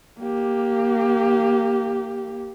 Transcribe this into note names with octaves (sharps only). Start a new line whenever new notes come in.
A#3 G4